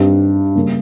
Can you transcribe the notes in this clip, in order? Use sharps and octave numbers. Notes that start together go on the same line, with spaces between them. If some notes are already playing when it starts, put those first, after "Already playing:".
Already playing: G2 G3 C4 D#4
C#3 G3 A#3 C#4